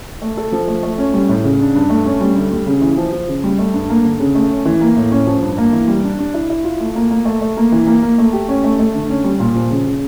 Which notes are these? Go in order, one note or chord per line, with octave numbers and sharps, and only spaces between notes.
A3
A4
F3
A3
A3
C#4
G3
A2
C#3
D4
G2
A3
C#4
G3
D2
G3
C#3
E3
F3
F3
C#3
G3
A3
G2
A#3
D3
C#3
A3
C#4
E3
A#3
A2
C#4
F3
G2
A#3
E3
G3
D4
D4
E4
E4
F4
A3
A#3
A#3
A3
A3
A#3
E3
A#3
A#3
A3
G4
C#4
A3
A3
D3
C#4
G3
A#2
F3
C#3
C#3